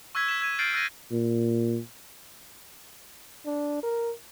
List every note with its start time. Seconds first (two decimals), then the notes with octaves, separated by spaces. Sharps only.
0.15 C#6 E6 F#6 G#6 B6
0.28 B6 E7
0.41 E6 G#6 D#7
0.59 F6 G6 A6 C7 D7 F#7
0.73 E6 F#6 A6 A#6 D#7
1.12 A#2
3.45 D4
3.83 A#4